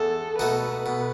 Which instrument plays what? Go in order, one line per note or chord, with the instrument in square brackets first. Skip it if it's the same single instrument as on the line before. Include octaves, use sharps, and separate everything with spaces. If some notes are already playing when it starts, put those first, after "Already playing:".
Already playing: [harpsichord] E2 [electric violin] A4
[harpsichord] B2 A3 D#4 F#4 [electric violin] B4
[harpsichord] B2